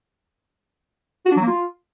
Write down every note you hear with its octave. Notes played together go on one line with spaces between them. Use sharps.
F#4
D4
F#3
A#3
F4